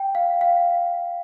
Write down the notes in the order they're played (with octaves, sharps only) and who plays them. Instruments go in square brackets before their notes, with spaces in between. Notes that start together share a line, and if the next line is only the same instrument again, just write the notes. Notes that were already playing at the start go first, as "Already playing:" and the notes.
Already playing: [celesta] G5
F5
F5